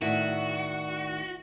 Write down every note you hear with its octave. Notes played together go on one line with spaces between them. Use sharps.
A2 D#3 E4 F#4 D5 F#5